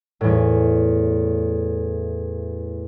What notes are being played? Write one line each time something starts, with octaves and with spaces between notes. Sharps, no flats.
E2 A2